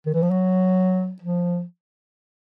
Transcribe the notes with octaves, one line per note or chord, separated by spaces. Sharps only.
D#3
E3
F3
F#3
F3